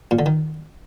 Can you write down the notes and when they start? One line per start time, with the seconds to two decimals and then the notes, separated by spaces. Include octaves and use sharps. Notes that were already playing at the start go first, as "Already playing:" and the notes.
0.11 A#2
0.19 D3
0.26 D#3